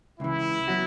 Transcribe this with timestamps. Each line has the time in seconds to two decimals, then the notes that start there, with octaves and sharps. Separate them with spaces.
0.19 C#2 C#3 E3 E4
0.68 F#3 B3 F#4